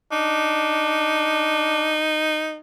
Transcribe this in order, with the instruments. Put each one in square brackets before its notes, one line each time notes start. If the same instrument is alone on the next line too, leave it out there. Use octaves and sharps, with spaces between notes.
[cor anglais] D4 [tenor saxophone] D#4